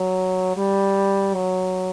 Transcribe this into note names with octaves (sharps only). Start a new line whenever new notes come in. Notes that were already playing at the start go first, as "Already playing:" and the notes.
Already playing: F#3
G3
F#3